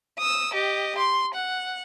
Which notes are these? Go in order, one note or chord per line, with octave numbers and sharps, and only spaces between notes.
D#6 E6
G4 D#5
C6
F#5